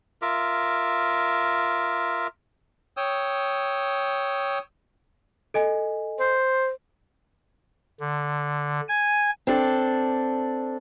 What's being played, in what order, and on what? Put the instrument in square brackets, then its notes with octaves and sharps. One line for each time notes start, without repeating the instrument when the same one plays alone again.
[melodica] F4 A#4 E5 D6
[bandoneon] C#5 G5 D#6 E6
[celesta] A4 D#5 G#5
[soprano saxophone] C5
[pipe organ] D3
G#5
[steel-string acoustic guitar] C4 D4 A4